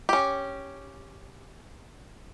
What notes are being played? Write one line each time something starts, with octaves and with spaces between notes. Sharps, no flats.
C#4 G4